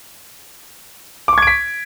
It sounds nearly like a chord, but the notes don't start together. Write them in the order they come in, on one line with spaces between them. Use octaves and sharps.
D6 C#6 G#6 D7 B6